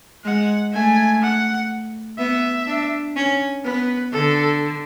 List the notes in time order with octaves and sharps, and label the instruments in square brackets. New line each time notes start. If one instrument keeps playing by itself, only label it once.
[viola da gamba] G#3 [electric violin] F#5
[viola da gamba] A3 [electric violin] G#5
[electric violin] F#5
[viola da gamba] B3 [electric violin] E5
[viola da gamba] D4
C#4
[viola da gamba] B3 [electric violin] B4
[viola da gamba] D3 [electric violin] A4